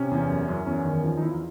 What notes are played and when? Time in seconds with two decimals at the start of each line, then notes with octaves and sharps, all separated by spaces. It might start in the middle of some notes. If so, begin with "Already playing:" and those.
Already playing: C3 C#4
0.11 E2
0.29 F#2
0.48 F#2
0.67 E2 C#4
0.85 D#3
1.03 F3 C#4
1.17 D#4
1.22 E2 E4
1.31 F4